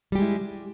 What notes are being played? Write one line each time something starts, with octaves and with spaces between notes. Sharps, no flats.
G3 G#3 E4 G4